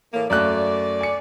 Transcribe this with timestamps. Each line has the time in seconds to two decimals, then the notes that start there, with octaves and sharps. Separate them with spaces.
0.13 A2 E3 A#3
0.30 F#2 A3 D5 F#6
1.01 G#5 C#7